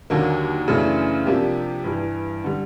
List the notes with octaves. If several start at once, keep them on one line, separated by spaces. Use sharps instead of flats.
D#2 D3 F#3 A#3
F#2 C#3 E3 A3 D4
C3 F3 A#3 D4 G4
G2 E3 G3
D3 G3